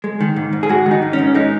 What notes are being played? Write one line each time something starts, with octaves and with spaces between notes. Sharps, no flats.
G#3
D#3
G#2
G#2
G#4
G#3 F#4
D#3
D#4
G#2
C#4
G#2
G#3 D#4